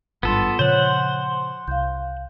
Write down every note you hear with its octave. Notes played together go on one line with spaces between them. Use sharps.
G#1 G2 B3 F4 A4 C6
A#2 C#3 F3 C5 C#5 F#5 F#6
C6
C2 F5 G6